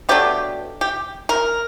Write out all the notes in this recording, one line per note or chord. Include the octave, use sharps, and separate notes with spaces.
B2 F#3 A3 D4 G4
G4
A#4